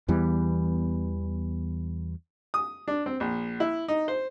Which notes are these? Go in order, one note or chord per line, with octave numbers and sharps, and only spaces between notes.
E2 E3 G3 B3
D#6
D4
C4
A#1
E4
D#4
C5